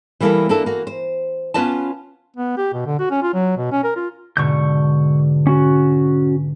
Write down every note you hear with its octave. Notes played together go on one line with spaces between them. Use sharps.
E3 G3 A#3 B3 E4 A4
A#3 D4 E4 A4
A#3 F#4
C5
B3 C#4 F4 B4 D#5 A5
B3
G4
B2
D3
F#4
C#4
F4
F#3
B2
C#4
A#4
F4
G#2 B2 D3 C#6 G6
C#4 F#4